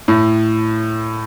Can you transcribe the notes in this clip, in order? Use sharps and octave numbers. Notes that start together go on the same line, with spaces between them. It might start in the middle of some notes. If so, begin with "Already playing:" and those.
A2